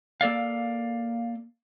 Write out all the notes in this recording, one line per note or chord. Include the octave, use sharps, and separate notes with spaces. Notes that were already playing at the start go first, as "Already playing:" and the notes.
A#3 A4 D5 F5